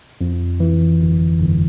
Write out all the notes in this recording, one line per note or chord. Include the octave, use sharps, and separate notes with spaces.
F2
E3
G1
G1